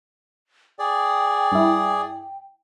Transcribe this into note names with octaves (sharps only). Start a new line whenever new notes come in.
G#4 D5 G5
G2 E4